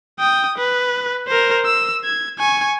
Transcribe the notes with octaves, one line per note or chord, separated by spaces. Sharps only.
G5 D#6
B4
A#4 C5
E6
G#6
G#5 C#6